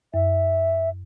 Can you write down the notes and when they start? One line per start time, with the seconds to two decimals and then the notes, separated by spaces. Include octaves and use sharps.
0.14 F#2 E5